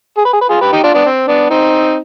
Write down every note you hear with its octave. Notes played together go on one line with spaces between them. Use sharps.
G#4
B4
G#4
B4
F4 G#4
G4 B4
D#4 G4
D4 F4
B3 D4
C4
B3 D4
C4 D#4